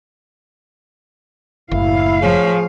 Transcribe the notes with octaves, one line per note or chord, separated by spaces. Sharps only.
F#1 A2 E4 F5
F3 G#4 C#5